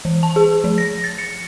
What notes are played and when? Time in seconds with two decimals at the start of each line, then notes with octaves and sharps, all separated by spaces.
0.05 E3
0.23 A5
0.36 G#4
0.64 F3
0.78 A#6
1.04 A6
1.18 C#7